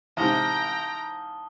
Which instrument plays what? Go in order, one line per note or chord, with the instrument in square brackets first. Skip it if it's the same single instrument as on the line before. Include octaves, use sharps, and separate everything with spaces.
[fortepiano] A1 G#2 C3 [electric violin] G5 A#5 [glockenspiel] A5 D#6 G7